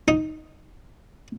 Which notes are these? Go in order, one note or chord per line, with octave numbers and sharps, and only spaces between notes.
D#4